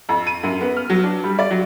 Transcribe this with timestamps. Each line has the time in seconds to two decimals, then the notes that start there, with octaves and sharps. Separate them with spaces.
0.09 F2
0.27 D#7
0.43 F#2
0.61 B3
0.77 F6
0.90 F#3
1.03 D4
1.24 G3
1.39 D5
1.51 F#3